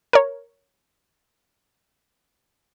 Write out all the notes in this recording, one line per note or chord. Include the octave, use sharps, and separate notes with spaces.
A#4 C#5